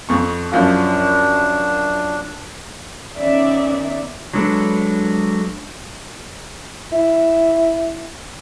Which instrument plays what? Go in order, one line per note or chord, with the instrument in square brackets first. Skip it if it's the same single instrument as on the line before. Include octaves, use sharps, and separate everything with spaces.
[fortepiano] F2 C#6
[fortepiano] F#2 F3 F4 [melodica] D4
[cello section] D#3 B3 C#4 [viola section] D#4 D5 E5
[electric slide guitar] F#3 G#3 D4 A4 B4
[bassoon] E4